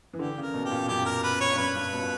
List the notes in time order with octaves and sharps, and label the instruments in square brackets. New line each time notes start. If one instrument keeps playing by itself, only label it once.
[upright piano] E3
[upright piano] D3 [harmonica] G4
[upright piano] C#3
[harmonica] A#4
[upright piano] B2
[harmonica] G4
[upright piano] A#2
[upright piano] F#2 [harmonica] G4
[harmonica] A#4
B4
C#5
[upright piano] G2
[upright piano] F#2 [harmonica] B4
[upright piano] G2
B2
A#2